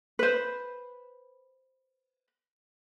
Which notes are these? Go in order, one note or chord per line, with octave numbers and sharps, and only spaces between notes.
B4 C5